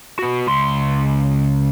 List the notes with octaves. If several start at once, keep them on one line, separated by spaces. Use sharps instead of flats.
B3 F#4
C#2 C6